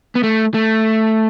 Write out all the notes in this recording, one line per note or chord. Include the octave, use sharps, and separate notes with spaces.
B3
A3
A3